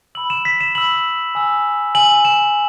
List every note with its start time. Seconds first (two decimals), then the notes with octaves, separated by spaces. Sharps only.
0.15 B5 E6 F#7
0.30 E7
0.45 B6
0.60 E7
0.75 B5 E6 F#7
1.35 G#5 E6
1.95 G#5 E6 F#7
2.25 E7